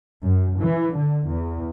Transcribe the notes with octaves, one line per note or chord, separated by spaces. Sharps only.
F#2
E3
D3
E2